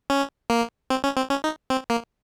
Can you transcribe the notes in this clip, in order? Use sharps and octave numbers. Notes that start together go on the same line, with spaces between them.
C#4
A#3
C4
C#4
C4
C#4
D#4
C4
A#3